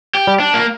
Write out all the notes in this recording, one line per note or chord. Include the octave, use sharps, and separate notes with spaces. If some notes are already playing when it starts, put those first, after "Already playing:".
G4
G3
D4
A#3